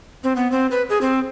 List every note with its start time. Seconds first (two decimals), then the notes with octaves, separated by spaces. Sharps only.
0.24 C4
0.36 B3
0.52 C4
0.71 B4
0.89 G#4
1.01 C4